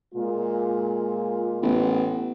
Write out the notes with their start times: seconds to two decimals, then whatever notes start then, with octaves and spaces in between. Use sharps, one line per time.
0.15 A#2 G#3 F4
1.62 A1 B3